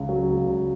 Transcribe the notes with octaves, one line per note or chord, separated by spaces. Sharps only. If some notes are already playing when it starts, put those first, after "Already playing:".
Already playing: C#2 C#3
F#3
C#2
C#2